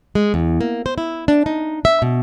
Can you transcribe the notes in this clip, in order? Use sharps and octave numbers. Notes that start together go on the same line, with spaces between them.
G#3
E2
A#3
C5
E4
D4
D#4
E5
B2